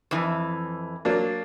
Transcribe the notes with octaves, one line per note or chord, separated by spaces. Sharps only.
F2 E3
F#3 A#3 D4